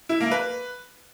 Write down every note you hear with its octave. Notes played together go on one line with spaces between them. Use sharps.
E4
A#3
B4